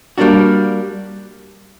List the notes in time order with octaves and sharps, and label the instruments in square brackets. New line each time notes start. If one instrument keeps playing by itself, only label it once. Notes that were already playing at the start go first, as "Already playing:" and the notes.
[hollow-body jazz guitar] G3 A#3 D4 F#4